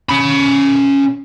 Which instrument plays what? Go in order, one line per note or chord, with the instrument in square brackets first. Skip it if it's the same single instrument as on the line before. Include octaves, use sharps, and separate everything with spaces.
[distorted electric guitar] C#4 B5